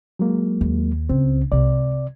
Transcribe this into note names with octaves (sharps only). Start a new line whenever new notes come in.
F#3 G#3 A#3
D#2
C#2 C4
C2 C3 G#3 D5